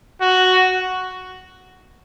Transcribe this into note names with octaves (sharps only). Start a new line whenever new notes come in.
F#4